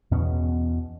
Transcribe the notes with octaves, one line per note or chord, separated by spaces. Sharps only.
E2 B2 B3 C#4